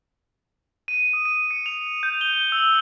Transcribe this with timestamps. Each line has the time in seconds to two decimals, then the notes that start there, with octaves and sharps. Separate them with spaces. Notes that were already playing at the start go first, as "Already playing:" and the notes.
0.88 D#7
1.13 D#6
1.25 D#7
1.51 C#7
1.66 F7
2.03 G6
2.21 G7
2.52 E6